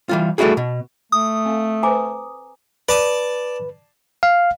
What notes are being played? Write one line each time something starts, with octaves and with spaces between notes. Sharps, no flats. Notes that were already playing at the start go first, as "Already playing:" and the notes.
E3 G3 F4
G3 A3 D#4 E4 F#4 G#4
B2
A3 D#6
C4 A4 F5
B4 C5 G#5 A#5 D6
B4 D5 A5 D#6
F5